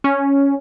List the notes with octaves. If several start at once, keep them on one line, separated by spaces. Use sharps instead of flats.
C#4